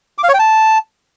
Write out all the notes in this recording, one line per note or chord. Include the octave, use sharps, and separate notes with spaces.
D6
F5
C#5
G5
A5